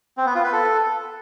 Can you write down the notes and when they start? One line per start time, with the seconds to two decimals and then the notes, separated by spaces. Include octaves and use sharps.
0.17 C4
0.26 B3
0.35 F4
0.44 B4
0.53 A4